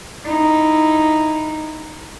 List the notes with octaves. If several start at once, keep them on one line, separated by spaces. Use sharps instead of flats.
D#4 E4